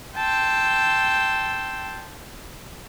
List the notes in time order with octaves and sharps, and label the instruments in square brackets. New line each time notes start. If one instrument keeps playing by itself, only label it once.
[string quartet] G5 A5 C6 E6